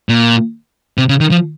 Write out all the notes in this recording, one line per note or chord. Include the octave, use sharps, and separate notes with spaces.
A#2
C3
C#3
D#3
F3